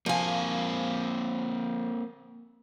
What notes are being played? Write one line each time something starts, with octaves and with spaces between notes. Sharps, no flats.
F3 A#3 C4 F5 G#5